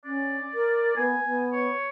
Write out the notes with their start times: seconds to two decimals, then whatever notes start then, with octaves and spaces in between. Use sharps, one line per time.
0.05 C#4 D5
0.54 A#4
0.97 B3 G#5
1.25 B3
1.53 C#5